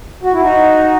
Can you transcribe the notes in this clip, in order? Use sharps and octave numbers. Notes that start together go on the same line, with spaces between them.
F#4
E4
D#4 F#4